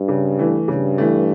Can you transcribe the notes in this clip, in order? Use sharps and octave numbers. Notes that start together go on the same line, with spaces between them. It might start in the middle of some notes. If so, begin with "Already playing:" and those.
Already playing: G2
C#3
E3 A3
G2 C#3
E3 A3